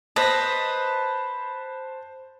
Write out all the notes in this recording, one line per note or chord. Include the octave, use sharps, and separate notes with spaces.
B4 C5 D#5 A5